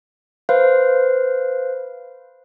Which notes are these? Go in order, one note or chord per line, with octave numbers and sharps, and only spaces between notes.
B4 C5 F5